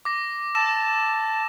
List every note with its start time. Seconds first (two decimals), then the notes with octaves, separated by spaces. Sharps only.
0.05 D6 A#6
0.55 A5 E6 A#6 E7